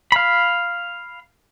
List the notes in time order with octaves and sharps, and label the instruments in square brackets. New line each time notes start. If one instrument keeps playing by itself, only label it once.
[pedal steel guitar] F5 B5